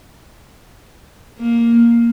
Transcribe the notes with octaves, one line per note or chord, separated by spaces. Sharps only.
A#3